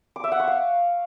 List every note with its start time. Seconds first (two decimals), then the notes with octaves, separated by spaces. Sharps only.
0.16 D6
0.24 E5
0.32 F#5
0.40 C#6
0.47 F5